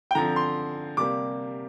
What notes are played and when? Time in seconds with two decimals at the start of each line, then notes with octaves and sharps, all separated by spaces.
0.11 G5
0.15 D3 F3 C4 A#5
0.36 C6
0.97 C3 G3 A#3 D6